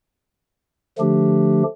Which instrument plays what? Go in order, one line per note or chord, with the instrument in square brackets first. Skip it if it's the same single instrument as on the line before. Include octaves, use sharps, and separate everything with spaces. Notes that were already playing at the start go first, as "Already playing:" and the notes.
[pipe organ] D3 F3 A3 D4 G4